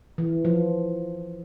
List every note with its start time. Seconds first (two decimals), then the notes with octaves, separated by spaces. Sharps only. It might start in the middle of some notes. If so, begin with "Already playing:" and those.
0.18 E3
0.45 F3